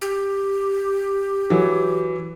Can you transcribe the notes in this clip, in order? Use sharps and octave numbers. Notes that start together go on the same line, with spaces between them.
G4
E3 F#3